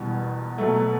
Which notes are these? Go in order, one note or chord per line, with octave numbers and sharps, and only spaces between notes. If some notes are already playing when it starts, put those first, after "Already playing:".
Already playing: E1 E2 B2 G3
B2 F#3 A3